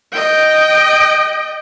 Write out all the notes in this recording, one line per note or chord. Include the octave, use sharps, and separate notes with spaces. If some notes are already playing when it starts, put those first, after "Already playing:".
D#5 G5